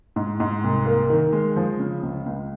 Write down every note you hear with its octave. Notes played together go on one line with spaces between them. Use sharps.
G#2
G#2
C2
A#3
D#3
G#3
F3
C#3
C#2
C#2